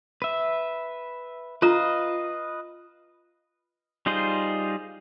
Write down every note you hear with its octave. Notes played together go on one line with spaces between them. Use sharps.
B4 E5
F4 B4 D#5 F5 A#5
G3 D#4 F4 G#4 C5